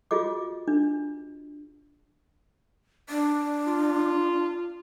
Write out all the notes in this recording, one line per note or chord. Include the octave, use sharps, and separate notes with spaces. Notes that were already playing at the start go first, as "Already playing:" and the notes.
F4 F#4 G#4 D#5 D6
D4
D4
F4